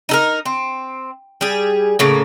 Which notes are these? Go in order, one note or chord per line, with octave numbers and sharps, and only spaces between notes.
D#4 A4 A#4
C4
G3 G#4
A2 C#3 A#3